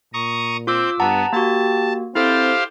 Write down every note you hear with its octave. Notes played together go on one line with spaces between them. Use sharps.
A#2 A#5 C#6 D#6
C4 F4 D6 E6 G6
G2 B3 F#5 A5 A#5
A#3 F#4 G4 A5
C4 E4 G4 A4 C5 F5 A6